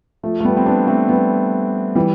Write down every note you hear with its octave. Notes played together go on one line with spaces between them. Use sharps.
F3 A3
A3
G3 B3
C4
B3 D4
A3 C4
G3 B3
E3 G3